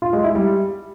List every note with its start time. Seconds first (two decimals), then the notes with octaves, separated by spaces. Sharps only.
0.02 F4
0.13 G#3
0.24 E4
0.35 G3